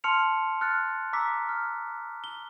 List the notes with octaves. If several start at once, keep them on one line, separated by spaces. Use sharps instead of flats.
A5 C6 F6 C#7 F7
F6 F#6 A6 C#7
A#5 D6 E6 B6
F6
G7